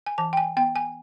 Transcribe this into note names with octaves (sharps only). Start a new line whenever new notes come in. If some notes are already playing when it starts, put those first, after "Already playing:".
G#5
E3 A5
G5
G#5
B3 G5
G#5